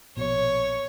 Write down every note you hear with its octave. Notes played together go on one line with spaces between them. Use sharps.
A#1 B2 C#5